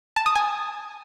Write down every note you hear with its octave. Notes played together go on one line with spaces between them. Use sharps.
A5
D#6
G#5